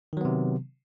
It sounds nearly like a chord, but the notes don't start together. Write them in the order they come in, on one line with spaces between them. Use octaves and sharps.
D#3 F#3 B3 C3